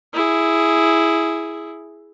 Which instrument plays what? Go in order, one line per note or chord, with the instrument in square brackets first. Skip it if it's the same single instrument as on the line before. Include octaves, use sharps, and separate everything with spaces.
[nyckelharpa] E4 G#4